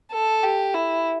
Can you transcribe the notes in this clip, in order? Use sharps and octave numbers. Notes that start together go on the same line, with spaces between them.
A4
G4
E4